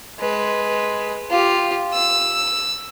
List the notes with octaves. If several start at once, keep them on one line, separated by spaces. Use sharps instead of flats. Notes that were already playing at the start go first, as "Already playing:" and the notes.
G#3 B4
F4 G4
E6